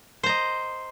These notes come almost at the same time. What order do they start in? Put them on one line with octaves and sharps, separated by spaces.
C5 A#5 D#5